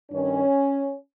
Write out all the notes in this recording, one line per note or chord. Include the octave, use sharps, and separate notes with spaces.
G2 D#3 C#4